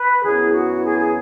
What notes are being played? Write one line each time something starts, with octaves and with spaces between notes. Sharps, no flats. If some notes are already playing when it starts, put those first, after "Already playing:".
Already playing: B4
F#2 E3 B3 E4 G#4
F#4
G#4
G#4